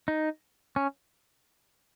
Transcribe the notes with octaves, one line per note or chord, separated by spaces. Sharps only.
D#4
C#4